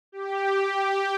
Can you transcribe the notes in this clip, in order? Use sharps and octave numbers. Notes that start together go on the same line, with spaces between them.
G4